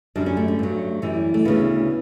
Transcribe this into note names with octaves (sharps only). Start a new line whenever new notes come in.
F#2 D3 G3 D4
C#4
A3
A3
G2 F#3
F#2 E3 G3
A3
D2 C#3 E3 B3